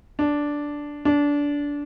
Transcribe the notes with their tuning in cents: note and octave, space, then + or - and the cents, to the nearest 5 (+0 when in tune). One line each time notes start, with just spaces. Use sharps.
D4 -5
D4 -20